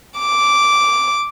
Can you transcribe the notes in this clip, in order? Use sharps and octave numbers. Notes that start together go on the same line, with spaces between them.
D6